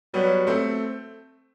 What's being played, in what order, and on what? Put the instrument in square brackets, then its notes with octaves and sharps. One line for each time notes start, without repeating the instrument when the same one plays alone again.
[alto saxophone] F#3 [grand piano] G3 B3
[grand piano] A3 C4